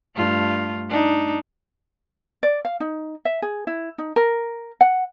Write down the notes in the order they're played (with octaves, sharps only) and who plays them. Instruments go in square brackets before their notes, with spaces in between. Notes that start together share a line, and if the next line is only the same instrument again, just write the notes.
[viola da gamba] G2 A3 F4
D4 D#4
[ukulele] D5
F5
D#4
E5
G#4
E4
D#4
A#4
F#5